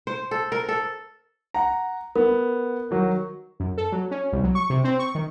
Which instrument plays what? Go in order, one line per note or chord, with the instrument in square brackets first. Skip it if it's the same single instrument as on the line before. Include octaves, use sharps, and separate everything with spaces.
[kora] C5
A4
A#4
A4
[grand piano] F#5 A#5
[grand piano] B3 [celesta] A#4
[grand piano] D#3 F#3 F#4
[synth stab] F#2
A4
F#3
C#4
C2
F#3
C#6
C3
C4
C#6
D#3